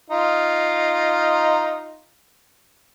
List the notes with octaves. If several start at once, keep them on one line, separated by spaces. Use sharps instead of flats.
D#4 F4